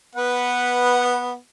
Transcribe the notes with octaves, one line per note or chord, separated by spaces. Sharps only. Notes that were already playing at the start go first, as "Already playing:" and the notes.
B3 B4 F#5